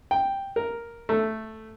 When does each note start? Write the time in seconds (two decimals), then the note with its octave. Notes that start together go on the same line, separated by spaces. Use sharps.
0.11 G5
0.56 A#4
1.09 A3